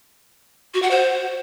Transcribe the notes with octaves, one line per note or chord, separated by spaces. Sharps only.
F#4
F#5
C5